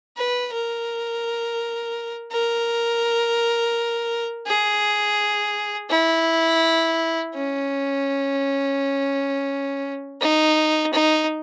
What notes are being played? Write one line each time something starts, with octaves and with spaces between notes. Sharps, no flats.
B4
A#4
A#4
G#4
E4
C#4
D#4
D#4